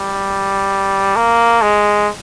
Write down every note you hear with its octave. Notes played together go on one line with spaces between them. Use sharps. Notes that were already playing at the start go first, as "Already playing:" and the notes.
Already playing: G3
A#3
G#3